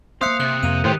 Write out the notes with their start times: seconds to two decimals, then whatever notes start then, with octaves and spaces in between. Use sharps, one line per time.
0.21 A#3 C4 C5 E5 F5 D#6 F#6 C#7
0.40 C3 F#6
0.63 F2 A#3 D#7 F7
0.84 A2 D#3 B3 G4 C5 G5